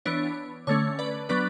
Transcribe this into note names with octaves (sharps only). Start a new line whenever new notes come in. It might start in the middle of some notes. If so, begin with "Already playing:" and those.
E3 B3 D4 C#5
D3 A3 C#4 C#5
B4 D5
F#3 B3 D4 B4 D5